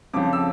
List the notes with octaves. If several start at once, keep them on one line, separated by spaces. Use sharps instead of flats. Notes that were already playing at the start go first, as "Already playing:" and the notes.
F2 C#3 F3 D6
E6